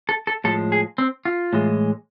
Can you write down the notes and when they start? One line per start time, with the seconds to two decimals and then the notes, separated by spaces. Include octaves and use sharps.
0.09 A4
0.27 A4
0.44 A2 F3 G#3 A4
0.72 G#4
0.98 C4
1.25 F4
1.53 A2 E3 G#3